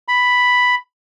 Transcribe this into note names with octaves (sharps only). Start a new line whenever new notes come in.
B5